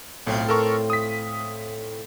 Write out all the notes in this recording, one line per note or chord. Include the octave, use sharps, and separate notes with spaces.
B1 A2 C4 F4
A4 A#4 C#6
D#6 B6